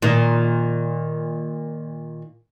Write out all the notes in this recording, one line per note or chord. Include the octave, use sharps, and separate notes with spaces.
A#2 D#3